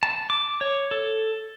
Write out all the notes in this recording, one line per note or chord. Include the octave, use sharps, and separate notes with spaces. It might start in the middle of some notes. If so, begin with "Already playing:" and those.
A5
D6
C#5
A4